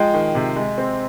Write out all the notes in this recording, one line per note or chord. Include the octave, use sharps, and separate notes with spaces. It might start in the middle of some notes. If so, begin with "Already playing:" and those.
Already playing: F3 G#3 G5
D#3
C3
G#3
C4